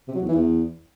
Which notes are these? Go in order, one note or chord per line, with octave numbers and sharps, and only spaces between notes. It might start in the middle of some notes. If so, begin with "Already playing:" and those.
C3
F#3
E2
E3
E2